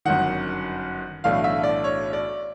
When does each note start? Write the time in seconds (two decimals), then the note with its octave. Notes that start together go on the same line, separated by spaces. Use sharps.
0.05 G1 F#2 D#3 F#5
1.24 B1 A2 E3 A3 D4 F5
1.44 E5
1.63 D5
1.84 C#5
2.13 D5